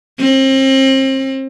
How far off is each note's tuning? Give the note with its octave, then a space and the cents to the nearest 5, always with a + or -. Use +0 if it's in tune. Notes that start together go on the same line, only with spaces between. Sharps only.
C4 +35